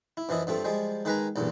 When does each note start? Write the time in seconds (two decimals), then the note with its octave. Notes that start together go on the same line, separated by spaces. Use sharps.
0.17 E4
0.29 F#2 E3 F3 E4 D#5
0.47 G2 F3 A3 C4
0.64 F3 G3 G#3
1.05 D#3 G#3 B4 G#5 A#5
1.36 B1 E2 G2 A#2